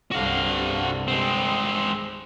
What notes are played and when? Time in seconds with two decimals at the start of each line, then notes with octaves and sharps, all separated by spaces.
0.12 C2 G2 D3 F#4 F5
1.08 G#3 C4